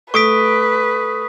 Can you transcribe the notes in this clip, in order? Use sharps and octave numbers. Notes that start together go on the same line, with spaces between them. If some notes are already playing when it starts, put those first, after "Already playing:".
A3 B4 C#6 D#6 B6 D7